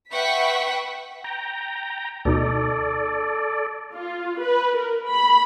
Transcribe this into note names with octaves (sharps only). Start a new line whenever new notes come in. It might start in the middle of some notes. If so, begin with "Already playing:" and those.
B4 E5 F#5 G5 C#6 B6
G5 A#5
D2 B2 D#4 A4 D5
F4
B4
A#4
B5